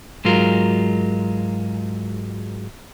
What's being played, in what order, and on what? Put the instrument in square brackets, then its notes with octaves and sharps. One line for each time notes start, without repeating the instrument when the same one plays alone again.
[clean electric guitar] G#2 F#3 G#3 F4 A#4